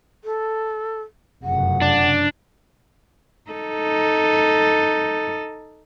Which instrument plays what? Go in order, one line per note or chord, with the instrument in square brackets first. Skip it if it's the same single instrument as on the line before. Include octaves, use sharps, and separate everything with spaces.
[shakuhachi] A4
[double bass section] F1 F#2 C#3 [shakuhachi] F#5
[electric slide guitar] D4
[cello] D#4 A4